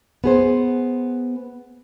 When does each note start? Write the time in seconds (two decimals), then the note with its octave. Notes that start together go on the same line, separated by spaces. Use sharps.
0.24 B3 G#4 C5